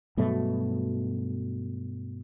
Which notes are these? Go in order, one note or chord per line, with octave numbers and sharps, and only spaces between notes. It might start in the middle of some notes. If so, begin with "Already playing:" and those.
G2 B2 F#3 A3